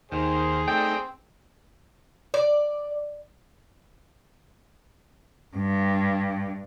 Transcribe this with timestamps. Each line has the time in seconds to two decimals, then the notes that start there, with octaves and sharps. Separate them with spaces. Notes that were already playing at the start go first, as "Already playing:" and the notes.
0.12 D#2 D#3 G#4 C5
0.68 A3 C4 D#4 D5 G5
2.34 D5
5.56 G2